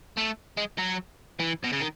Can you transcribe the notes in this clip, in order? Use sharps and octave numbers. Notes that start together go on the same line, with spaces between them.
A3
G#3
F#3
E3
B2
C#3
D#3